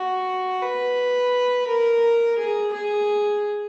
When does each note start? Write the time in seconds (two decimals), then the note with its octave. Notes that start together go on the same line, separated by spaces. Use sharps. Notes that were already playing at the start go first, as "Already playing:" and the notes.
Already playing: F#4
0.61 B4
1.67 A#4
2.37 G#4
2.73 G#4